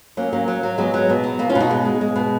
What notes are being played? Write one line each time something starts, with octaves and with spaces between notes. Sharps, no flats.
F#3 A#3 C#4
F#3 A#3 C#4
F#3
F#3
F#3 G#3 B3
F#3
B2
F#3
B2 A#3
C#4 F4
B2
D#4 F#4
G#3
G#3
G#3
B2